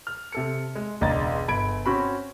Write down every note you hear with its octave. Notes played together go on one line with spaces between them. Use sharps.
F6
C3 A4 C#7
G#3
E1 C#2 D4 D#5 A#5 A6
G1 B5 G#6 D7
C4 C#4 F#4 B5